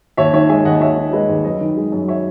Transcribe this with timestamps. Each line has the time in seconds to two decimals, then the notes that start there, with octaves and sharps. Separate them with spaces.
0.17 D#2 C#5 E5
0.34 D#3 C#5 E5
0.49 G#3 E5 G#5
0.65 D#2 D#5 F#5
0.81 D#2 C#5 E5
0.97 D#3
1.13 G#3 B4 D#5
1.29 D#2
1.45 F#2 B4 D#5
1.61 D#3
1.77 G#3
1.92 F#2
2.08 C#5 E5